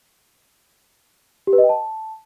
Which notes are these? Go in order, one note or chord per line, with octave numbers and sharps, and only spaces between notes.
G4
B4
D#5
G5
A5